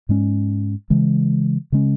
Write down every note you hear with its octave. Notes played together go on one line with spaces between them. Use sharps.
G#2 G#3 C#4
C#3 E3 G#3
C#3 G#3 C#4